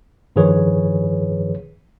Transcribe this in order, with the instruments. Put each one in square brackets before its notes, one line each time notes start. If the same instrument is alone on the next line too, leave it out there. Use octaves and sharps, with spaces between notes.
[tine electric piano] G2 D#3 F3 G#4 B4 C#5